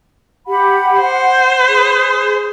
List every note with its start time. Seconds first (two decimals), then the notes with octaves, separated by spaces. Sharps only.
0.47 G4 F#5 B5
1.00 C5 F#5
1.67 G#4